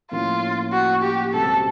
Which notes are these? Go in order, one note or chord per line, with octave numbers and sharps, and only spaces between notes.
A2 F3 A#3 C#4 E4 F4
F#4
G4
C#2 B2 G3 C4 A4